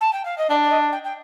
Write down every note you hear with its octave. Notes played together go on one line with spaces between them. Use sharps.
A5
G5
F5
D#5
D4 D5
D5
D#5
G5
G5